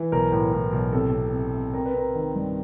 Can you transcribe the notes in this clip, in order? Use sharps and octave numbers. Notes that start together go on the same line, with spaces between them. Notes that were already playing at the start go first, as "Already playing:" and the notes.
Already playing: E3
B1 A#4
A2
A2
B1
C3 A4
C3
C3
C3
C4 A#4
B4
C4 A#4
D#3
G2